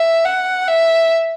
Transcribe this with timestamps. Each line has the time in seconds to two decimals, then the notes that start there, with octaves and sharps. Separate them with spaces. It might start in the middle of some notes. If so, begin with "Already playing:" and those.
Already playing: E5
0.25 F#5
0.68 E5